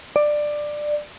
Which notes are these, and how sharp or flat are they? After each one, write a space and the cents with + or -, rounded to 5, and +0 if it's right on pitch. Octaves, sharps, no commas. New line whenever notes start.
D5 +15